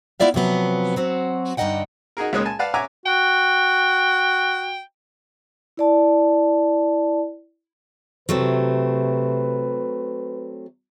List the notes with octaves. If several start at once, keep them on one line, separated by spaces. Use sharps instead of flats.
B3 E4 F4 D5 E5 F5
C3 F3 F#3 B3
F#3 C4 F#4
G2 D3 D#4 D#5 F#5 G5
D#4 F#4 G#4 A#4
C#2 A#2 G#3 C#4 D#6 F#6
G#5 A5
B4 D5 F5 F#5 A5
C#5 E5 F#5 G#5 A#5 D6
F#4 G5
E4 D5 A5
C3 F#3 A3 C4 B4